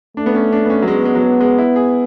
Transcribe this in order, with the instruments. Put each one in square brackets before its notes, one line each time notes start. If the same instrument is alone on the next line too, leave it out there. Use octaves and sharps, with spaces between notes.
[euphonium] A3 [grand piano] D4
[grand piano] B3
C#4
D4
B3
C#4
F#3
[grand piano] G#3 [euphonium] B3
[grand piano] G#3
F#3
G#3
G#3
E4
G#4